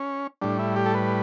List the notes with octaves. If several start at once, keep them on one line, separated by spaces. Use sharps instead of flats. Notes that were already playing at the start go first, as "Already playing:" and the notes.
Already playing: C#4
A2 G3 D4
E4
G4
A4
B4